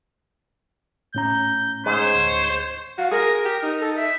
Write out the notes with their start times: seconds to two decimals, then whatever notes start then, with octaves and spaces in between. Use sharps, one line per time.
1.15 A2 C#4 A#5 G6
1.86 G#2 C5 C#5
2.15 D2
2.98 F#4 F5
3.11 G#4 A#4
3.45 G4
3.63 D#4
3.80 A4
3.95 E5